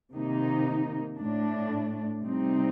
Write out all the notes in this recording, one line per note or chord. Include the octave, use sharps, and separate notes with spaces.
C3 D#3 A#3 D#4
A2 A3 D4
C3 G3 C4 D#4